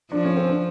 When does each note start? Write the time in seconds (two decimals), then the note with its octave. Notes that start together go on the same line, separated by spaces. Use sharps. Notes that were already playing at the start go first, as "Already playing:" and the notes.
0.12 F3 D4
0.25 C#4
0.37 C4
0.49 D4